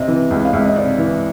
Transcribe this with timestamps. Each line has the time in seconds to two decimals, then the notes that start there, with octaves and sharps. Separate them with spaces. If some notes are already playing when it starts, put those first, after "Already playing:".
Already playing: C3 D#5
0.08 E3
0.31 C#2
0.45 F5
0.53 C#2 E5
0.66 D#5
0.76 C3 D5
0.98 E3